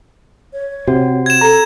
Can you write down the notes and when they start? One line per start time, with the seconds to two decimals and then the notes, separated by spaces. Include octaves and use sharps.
0.53 C#5
0.88 C3 F#4
1.26 G#6 E7
1.41 A4 A#5